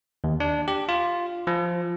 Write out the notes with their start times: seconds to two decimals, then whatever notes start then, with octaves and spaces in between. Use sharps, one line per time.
0.24 D#2
0.40 D4
0.68 G4
0.89 F4
1.47 F3